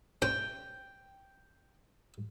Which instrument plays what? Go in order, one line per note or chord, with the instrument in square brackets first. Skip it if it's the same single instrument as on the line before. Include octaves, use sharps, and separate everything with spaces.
[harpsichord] C#4 C5 [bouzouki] G5